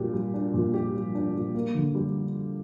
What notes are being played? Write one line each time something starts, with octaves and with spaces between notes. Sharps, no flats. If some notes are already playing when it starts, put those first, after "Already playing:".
Already playing: A#2 G3 D4 G4
G3
D4
A#2
G4
G3
D4
A#2
A#3
D3
G3